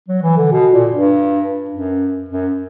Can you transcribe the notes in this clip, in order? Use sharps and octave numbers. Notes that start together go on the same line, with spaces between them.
F#3
E3
D3
B2
A#2
G2
F#2
F#2